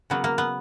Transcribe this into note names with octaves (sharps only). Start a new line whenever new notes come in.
C#3 F#3 A#3 B3
A#3
B3